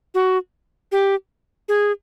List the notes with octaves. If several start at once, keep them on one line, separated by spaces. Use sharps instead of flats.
F#4
G4
G#4